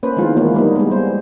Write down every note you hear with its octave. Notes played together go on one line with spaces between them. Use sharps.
A#3 C#4 B4 C5
D#3 E3 G#3 B3 F4
E3 A#3 B3 E4 C#5
G3 A#3 D#4
G#3 B3
G3 C5